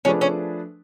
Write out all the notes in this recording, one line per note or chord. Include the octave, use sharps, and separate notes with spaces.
F3 A3 C#4 D4 G#4 B4
C#4